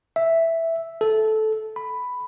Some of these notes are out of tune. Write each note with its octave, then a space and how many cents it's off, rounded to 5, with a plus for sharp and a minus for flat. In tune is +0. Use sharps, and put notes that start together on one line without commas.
E5 +0
A4 -15
B5 +5